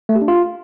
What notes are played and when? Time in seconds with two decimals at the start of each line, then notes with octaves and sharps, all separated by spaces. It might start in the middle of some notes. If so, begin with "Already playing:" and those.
0.09 A3
0.15 G4
0.22 D4
0.28 F4